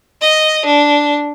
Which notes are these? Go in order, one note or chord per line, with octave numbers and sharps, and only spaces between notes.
D#5
D4